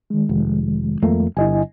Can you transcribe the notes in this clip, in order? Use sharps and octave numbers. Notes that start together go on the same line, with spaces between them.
D#3 G#3
F1
F2 A3 A#3
G1 G2 E4 D#5 G#5